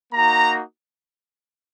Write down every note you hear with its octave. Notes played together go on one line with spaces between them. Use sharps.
A#3 D#4 F#4 A#5